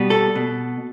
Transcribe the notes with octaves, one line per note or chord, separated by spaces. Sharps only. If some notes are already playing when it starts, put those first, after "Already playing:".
Already playing: B2 G3 B3
A4
B2